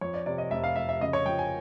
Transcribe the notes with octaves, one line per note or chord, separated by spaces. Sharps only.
F2 C#5
D5
C3 D5
D#5
F1 E5
F5
F1 E5
E5
C#3 D#5
C#5
F3 G5
G#5